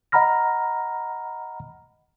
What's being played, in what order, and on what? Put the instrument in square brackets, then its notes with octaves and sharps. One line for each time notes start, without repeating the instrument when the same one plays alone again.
[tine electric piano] D#5 F#5 A#5 B5 F6 A#6